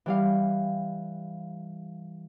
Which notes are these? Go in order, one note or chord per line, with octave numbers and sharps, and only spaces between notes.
E3 G3 F5